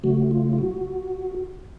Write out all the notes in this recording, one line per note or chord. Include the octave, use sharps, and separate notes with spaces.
C#3 F#3 A3 F#4
F4
F4
F#4